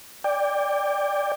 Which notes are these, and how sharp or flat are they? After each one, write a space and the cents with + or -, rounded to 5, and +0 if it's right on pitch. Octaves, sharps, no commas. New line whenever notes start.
D5 +0 G5 +25